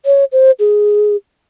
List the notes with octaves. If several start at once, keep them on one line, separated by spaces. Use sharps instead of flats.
C#5
C5
G#4